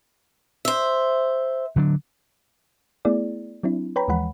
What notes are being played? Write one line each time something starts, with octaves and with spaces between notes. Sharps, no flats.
C5 E5
D3 F#3 D4
A3 B3 E4 G#4 D5
F#3 C4 D4 E4
B4 C#5 G5 A#5 B5
D#2 E3 F3 G#3 F#5 B5